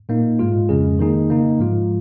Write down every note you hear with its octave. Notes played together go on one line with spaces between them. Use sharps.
A#2 A#3 D#4
G#2 G#3 F4
F2 C#3 G#3 C#4 G#4
D#3 A#3 D#4 G#4
C#3 A#3 D#4
G#2 F3 G#3 F4